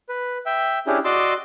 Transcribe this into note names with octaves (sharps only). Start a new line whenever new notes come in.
B4
E5 G5
C#4 D4 E4 G4 G#4
F#4 D5 D#5 C6 D6 E6